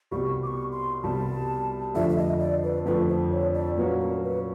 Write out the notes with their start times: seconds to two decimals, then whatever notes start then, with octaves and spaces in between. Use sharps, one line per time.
0.11 C2 B2 G3 C#6
0.43 D6
0.47 C#6
0.72 C6
1.03 C2 B2 G3 A5
1.94 F2 D3 F3 A3 D4 E5
2.10 E5
2.18 D#5
2.40 D5
2.63 B4
2.85 F2 D3 F3 A3 D4 B4
3.09 C5
3.31 C#5
3.54 D5
3.77 A#2 F#3 A#3 C#4 F#4 B4
4.00 A#4
4.23 B4